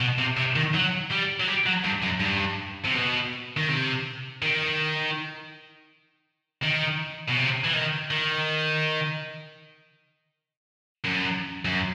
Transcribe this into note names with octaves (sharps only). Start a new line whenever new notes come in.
B2
C3
C3
D#3
F#3
G3
F#3
G3
F#3
G2
F#2
G2
C3
B2
D#3
C3
D#3
D#3
B2
C3
E3
D#3
D#3
F#2
F#2